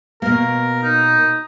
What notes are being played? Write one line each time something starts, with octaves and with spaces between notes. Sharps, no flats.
B2 A#3 A#4
D#4